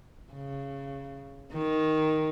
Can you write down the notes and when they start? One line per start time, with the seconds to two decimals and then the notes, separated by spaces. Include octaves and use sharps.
0.33 C#3
1.52 D#3